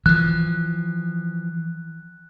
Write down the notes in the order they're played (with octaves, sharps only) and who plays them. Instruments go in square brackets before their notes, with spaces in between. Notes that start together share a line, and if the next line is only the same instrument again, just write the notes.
[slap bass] E3 F3 [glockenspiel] F#6